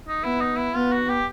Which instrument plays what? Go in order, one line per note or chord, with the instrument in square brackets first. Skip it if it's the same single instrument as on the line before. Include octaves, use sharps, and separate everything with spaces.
[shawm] D#4
[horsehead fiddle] B3 [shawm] E4
[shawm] D#4
E4
[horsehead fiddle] B3 [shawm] F4
[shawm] F#4
G4